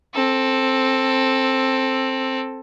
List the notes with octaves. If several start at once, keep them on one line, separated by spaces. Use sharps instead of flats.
C4 A4